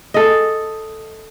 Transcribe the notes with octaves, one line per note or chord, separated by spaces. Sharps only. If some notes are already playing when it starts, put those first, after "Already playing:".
A4 D#5